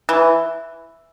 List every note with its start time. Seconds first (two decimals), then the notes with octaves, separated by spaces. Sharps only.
0.09 E3